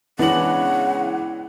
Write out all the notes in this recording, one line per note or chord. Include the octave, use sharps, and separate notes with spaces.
C#3 E3 G#3 B3 D4 F#5 F#7